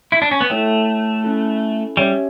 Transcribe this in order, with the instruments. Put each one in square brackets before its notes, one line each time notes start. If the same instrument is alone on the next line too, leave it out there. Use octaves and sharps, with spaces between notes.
[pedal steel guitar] E4
D4
C#4
B3
[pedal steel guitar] A3 [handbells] E4 A4 C#5 G5
[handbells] C#4 E4 A4
[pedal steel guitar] G3 [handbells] C#4 G4 C#5 E5